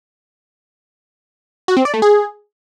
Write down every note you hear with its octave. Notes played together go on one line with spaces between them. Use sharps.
F#4
C4
D5
A3
G#4